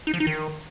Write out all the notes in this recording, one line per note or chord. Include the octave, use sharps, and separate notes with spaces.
D#4
F3
D#4
D#3